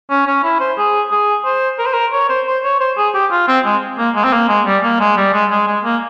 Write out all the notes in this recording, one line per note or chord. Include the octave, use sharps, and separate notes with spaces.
C#4
C#4
E4
C5
G#4
G#4
C5
A#4
C5
A#4
C#5
C5
C5
C#5
C5
G#4
G4
F4
C4
G#3
A#3
G#3
C4
A#3
G#3
G3
A#3
G#3
G3
G#3
G#3
G#3
A#3